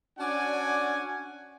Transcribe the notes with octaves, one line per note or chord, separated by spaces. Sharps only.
C#4 D4 F#4 D5 F#5 G#5